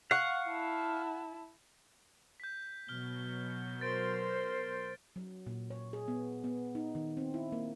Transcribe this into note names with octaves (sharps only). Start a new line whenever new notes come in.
F5 F#5 C#6
E4 A5
G6 B6
B2 F#3 F6 G7
A#4 C5 A6 D7
F#3
A#2
C#5
G#4
B3
B3
D#4
D#3
C4
E4
A#3